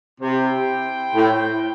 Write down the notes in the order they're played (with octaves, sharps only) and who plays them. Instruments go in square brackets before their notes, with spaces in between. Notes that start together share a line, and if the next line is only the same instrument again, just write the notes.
[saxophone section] C3 [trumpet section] E4 C5 G5
[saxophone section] A2